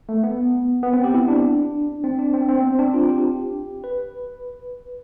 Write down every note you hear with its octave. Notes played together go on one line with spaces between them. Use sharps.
A3
B3
B3
C4
G4
E4
D4
C4
D4
C4
C4
B3
C4
D4
F4
G4
B4